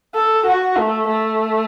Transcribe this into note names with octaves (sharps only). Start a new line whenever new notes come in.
A4
F#4
A3
A3